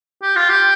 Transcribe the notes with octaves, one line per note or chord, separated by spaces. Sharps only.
G4
F4
G4